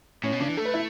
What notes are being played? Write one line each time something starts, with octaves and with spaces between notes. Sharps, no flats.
A2 C#4
B2
C#3 D4
E3
A3 A4
B4
E4